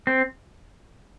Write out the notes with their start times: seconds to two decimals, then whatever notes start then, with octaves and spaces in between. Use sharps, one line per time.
0.07 C4